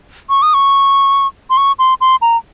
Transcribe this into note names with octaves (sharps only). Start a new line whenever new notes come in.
C#6
D#6
C#6
C6
C#6
C6
C6
A#5